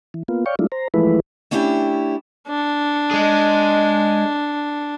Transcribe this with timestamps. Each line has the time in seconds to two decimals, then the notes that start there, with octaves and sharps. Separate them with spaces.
0.14 E3
0.28 A#3 B3 F4
0.46 C#5 D5 F5 G5 C#6
0.59 F#3 G#3 A3 D4 E4 F4
0.72 C5 A#5
0.94 E3 F3 G#3 A3 E4 B4
1.51 A3 C#4 D4 E4 G4
2.48 D4
3.11 G#3 G#4